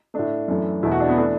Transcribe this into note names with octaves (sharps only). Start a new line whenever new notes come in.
A2 A3 D4
F#2 E3 A3
E2 B2 A3 E4
F#4
D4
B3
E3 A3 D4